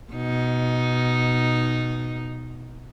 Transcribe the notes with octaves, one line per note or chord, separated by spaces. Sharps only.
B2 D#4